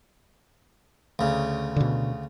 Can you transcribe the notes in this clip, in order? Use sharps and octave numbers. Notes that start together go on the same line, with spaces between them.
D2 C#3
B2 D3